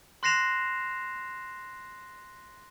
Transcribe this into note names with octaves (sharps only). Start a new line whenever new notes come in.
C6 F#6 A#6 C7 E7 F7